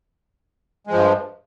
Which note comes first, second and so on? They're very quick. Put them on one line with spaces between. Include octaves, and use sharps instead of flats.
G#3 F3 G2